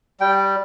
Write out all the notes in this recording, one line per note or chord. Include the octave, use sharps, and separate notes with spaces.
G3 G5